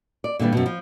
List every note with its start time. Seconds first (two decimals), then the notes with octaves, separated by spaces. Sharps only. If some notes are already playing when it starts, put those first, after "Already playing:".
0.24 D5
0.39 A#2 D3 E3 G3
0.53 F#2 B2
0.66 F3